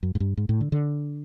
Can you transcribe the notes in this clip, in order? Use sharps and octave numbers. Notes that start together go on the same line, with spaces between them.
F#2
G#2
G2
G#2
A2
D3
D3